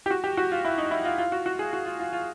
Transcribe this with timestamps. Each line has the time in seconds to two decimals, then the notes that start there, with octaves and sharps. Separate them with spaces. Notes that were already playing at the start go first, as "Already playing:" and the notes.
0.06 G4
0.10 F#4
0.24 G4
0.37 F#4
0.52 F4
0.65 E4
0.78 D#4
0.91 E4
1.05 F4
1.18 F4
1.32 F#4
1.46 F#4
1.59 G#4
1.73 F#4
1.86 F4
2.00 F4
2.13 F4